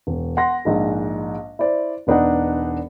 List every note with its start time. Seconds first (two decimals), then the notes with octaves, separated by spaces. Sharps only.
0.07 E1
0.37 F#5 C6 A#6
0.65 A#1 G#2 G#3
1.59 E4 C5 D5
2.07 E1 B3 D4 D#4 D#5 F#5